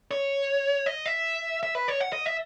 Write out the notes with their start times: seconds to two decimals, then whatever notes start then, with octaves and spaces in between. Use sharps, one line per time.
0.11 C#5
0.86 D#5
1.06 E5
1.63 E5
1.75 B4
1.88 C#5
2.00 F#5
2.13 D#5
2.26 E5